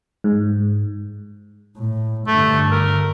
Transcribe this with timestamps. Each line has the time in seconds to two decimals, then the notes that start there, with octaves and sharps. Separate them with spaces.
0.24 G#2
1.77 A2
2.27 G2 D3 A3
2.72 A#4